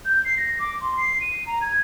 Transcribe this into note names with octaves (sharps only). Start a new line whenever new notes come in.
G6
C7
A#6
D6
C6
C7
D#7
A#5
G#6